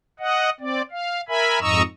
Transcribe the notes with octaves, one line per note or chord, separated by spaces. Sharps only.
D#5 F#5
C4 D5
F5
A#4 E5 G#5 B5
F2 G#2 D#5 A#5 C#6 E6